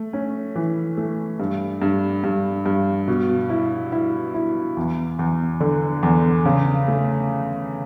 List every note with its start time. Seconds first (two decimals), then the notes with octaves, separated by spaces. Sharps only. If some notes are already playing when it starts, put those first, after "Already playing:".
Already playing: A3
0.13 C#4
0.56 E3
0.97 A3
1.40 G2
1.82 G2
2.24 G2
2.66 G2
3.08 B2
3.49 E4
3.92 E4
4.34 E4
4.77 E2
5.19 E2
5.60 D3
6.03 E2
6.45 C#3
6.88 A3